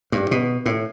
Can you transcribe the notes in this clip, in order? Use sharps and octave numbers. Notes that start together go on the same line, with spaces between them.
G2
B2
A2